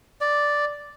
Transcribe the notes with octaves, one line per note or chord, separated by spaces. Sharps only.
D5